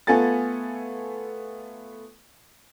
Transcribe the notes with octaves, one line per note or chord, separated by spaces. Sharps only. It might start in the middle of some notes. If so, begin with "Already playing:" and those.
A3 B3 F4 A4 G#5 A6